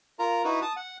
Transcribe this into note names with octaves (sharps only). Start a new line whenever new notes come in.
F4 A#4 A#5
D#4 E4 F#4 B4
A5 D#6
F#5